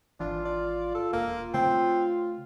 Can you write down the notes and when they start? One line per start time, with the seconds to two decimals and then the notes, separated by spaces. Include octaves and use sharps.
0.20 G#1 E3 D4 F4
0.45 D5
0.94 A4
1.13 E1 A#3
1.54 C#3 A3 C4